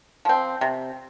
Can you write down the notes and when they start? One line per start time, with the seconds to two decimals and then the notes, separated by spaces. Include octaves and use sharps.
0.25 F3 C4
0.61 C3